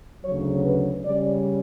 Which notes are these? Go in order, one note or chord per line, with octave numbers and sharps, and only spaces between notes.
D2 C#3 F#3 C#5
B4
C#3 G3 C#4 D5